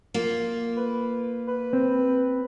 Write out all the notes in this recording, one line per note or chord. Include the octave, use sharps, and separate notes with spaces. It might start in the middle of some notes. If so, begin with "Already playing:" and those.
A#3 F4
B4
B4
C4